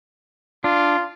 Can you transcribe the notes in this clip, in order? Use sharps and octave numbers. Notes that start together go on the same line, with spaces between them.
D4 F4